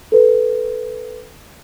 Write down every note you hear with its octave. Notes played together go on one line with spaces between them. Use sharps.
A4 B4